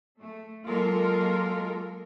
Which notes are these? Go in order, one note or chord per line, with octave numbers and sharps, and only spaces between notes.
A3
F#3 G#3 A#3 F4 A4 A#4